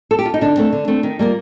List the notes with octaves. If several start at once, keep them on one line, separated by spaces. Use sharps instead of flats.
A4
G4
F4
D#4
D3 D4
A3 C4
D3
A3 C4
D#3
G3 A#3 F4